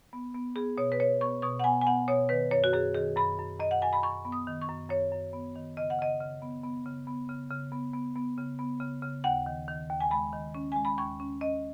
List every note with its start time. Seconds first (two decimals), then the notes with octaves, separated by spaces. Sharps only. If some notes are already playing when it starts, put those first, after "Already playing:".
0.13 B3
0.34 B3
0.56 B3 G#4
0.77 B2 C#5
0.92 B4
1.00 B2 C#5
1.21 B3 C#6
1.42 B2 C#6
1.59 F#5
1.64 B3 G#5
1.81 G#5
1.86 B3 F#5
2.08 B2 C#5
2.29 D#3 B4
2.51 F#2 C#5
2.64 F#4
2.73 F#2 G#4
2.94 D#3 G#4
3.17 F#2 B5
3.39 F#2
3.60 F#2 D#5
3.71 F#5
3.82 F#2 G#5
3.93 B5
4.03 F#2 C#6
4.25 B3
4.32 D#6
4.47 D#3
4.61 C#6
4.68 F#2
4.90 F#2 C#5
5.12 F#2
5.33 B3
5.56 D#3
5.77 C#3 D#5
5.90 F#5
5.99 C#3 D#5
6.21 C#3
6.42 B3
6.64 B3
6.86 C#3
7.07 B3
7.29 C#3
7.50 C#3
7.72 B3
7.93 B3
8.16 B3
8.38 C#3
8.59 B3
8.81 C#3
9.02 C#3
9.24 D#2 F#5
9.46 D#3
9.68 D#3
9.89 D#2
10.00 G#5
10.11 G#3 B5
10.33 D#3
10.55 C#4
10.72 G#3 G#5
10.85 B5
10.98 D#2 C#6
11.20 C#4
11.41 C#4 D#5